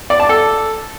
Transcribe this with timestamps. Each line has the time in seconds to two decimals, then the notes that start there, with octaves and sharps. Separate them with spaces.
0.10 D5
0.20 A5
0.29 A4